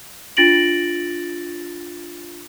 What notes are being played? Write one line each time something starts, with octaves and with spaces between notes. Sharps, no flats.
D4 F4 A6 A#6 D7 F#7